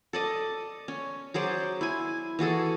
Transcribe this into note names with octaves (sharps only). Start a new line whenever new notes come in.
A4 D5 D#5
C#4
F#3 G#4 C5 D5
E4 G#5
E3 F#4 G#4 A4